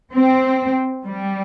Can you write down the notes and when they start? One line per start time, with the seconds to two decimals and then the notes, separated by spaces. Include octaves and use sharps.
0.14 C4
1.05 G3